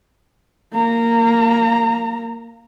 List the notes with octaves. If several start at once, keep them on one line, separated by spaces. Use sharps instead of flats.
A#3 A#5